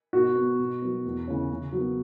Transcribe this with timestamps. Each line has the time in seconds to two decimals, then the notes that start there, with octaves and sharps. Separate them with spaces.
0.13 B2 F#4
0.36 B3
0.59 B2
0.82 F#3 B3
1.05 E2
1.27 C#3 E3 C#4
1.50 C#3
1.72 F#3
1.78 B3